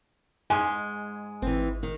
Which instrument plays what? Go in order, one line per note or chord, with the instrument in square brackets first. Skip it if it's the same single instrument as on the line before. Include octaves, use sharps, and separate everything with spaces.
[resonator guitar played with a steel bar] G#2 G#3 [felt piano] G#5
[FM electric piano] G#1 [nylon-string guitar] E3 C4
[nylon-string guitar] D#3